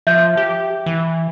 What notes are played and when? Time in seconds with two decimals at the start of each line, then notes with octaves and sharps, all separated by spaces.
0.07 F3 E5 G6
0.37 G4
0.86 E3